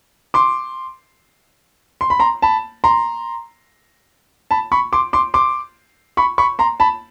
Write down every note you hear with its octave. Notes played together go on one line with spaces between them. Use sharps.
C6 D6
C6
B5
A#5 C6
A5 B5
A#5 C6
A5 B5
B5 C#6
C6 D6
C6 D6
C6 D6
B5 C#6
B5 C#6
A#5 C6
A5 B5